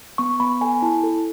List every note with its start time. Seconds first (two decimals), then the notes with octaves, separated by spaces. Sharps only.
0.18 B3 C#6
0.40 B3 B5
0.61 A4 G#5
0.82 E4 A5
1.04 A4